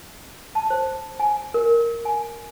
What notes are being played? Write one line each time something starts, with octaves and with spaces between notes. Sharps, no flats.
A5
C5
G#5
A#4
G#5